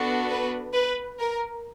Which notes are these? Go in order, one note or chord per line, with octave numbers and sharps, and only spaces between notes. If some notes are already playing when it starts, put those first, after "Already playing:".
Already playing: B3 D4 F#4 A4
B4
B4
A#4